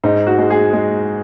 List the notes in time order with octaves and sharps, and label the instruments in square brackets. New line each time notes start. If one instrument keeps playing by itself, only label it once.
[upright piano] G#2 D#4
F#4
G#3
G#4
G#3